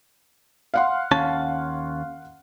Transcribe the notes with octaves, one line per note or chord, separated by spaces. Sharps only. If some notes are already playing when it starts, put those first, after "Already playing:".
F5 F#5 C6
D#2 C#4 A5